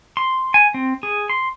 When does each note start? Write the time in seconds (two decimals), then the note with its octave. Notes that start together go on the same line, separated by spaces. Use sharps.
0.17 C6
0.54 G#5
0.74 C4
1.03 G#4
1.29 C6